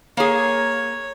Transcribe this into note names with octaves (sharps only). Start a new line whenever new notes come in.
A#3 G#4 C#5